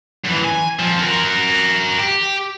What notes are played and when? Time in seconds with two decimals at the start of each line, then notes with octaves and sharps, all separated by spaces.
0.25 F#2 E3
0.44 G#5
0.80 F2 F3
0.99 F#4 A#4
1.98 G4